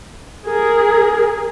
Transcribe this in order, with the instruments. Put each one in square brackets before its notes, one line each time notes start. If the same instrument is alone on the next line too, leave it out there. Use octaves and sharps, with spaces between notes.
[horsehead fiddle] G#4 A#4